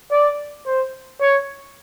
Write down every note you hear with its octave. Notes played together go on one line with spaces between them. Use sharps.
D5
C5
C#5